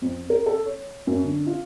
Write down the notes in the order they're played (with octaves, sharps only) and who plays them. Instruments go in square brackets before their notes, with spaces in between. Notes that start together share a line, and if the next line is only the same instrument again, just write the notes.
[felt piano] F2
A#4
A4
C#5
F#2
D3
F4